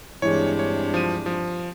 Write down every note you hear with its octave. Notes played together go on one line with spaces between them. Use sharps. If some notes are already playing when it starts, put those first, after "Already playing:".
G2 C3 E3 G#3 D4 C#5
C#5
F3 D#7
F3